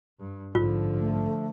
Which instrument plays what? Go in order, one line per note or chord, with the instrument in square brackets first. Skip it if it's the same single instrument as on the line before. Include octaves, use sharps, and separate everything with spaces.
[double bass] G2
[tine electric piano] A#1 G#2 [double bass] D3 F3 [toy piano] F4
[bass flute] A3